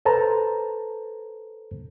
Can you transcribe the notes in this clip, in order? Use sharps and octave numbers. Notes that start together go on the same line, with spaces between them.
A4 B4 C5 A5 A#5